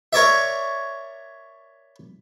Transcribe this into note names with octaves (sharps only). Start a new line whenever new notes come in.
A#4 C#5 D5 E5